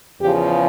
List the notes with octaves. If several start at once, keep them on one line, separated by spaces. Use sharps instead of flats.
E2 C#3 F3 G4